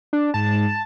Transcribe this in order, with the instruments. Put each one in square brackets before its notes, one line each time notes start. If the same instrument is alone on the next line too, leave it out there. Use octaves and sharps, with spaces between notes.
[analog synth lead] D4
[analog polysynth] G#2 [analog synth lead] A5